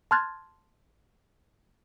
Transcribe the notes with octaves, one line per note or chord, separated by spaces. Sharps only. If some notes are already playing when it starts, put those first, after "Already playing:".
A5 C6 F6 F#6 G#6 A6